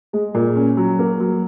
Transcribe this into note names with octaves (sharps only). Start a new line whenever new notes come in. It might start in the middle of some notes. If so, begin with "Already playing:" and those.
G#3
A#2
C#4
F#3
A#3
F#3